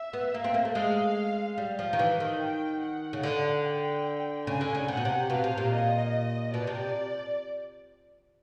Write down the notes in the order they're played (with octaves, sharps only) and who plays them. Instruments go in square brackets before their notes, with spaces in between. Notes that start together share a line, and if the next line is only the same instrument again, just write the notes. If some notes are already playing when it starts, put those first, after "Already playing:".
Already playing: [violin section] E5
[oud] B3
A#3
C4
A#3
A3
[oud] G#3 [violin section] F5
[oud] G3
F3
D#3
E3
D#3
[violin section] G5
F#5
[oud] C#3
D3
[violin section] G5
[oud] C#3 [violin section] G#5
[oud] D3
C#3
[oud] C3 [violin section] F#5
[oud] B2
C3
[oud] B2 [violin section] F5
[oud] C3
A#2
[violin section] D#5
[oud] B2 [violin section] D5
[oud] C3